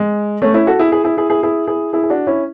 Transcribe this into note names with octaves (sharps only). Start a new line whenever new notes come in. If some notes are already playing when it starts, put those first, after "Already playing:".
Already playing: G#3
A3 C#4
C#4 E4
F#4 A4
E4 G#4
E4 G#4
E4 G#4
E4 G#4
E4 G#4
E4 G#4
E4 G#4
E4 G#4
G#4
D4 F#4
C#4 E4